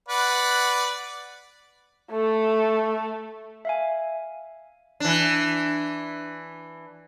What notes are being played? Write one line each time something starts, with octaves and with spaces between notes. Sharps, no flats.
B4 D5 F#5
A3 A4
E5 F5 G#5
E3 D4